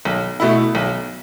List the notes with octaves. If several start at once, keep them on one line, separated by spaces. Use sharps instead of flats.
B1
B2 A3 E4
B1